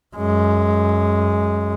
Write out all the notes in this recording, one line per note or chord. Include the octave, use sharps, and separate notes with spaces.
F#2 G#3